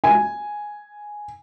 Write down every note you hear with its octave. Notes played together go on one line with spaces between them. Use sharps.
G#5